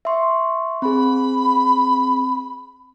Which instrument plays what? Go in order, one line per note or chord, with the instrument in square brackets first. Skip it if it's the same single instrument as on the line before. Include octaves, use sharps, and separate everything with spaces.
[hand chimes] E5 C6 C#6
[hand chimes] C4 G#4 [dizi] B5